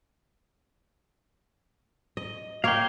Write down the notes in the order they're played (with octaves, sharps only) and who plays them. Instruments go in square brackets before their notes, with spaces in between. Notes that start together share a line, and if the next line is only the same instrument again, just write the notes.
[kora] D#5
[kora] A#3 C#5 [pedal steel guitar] F5 G5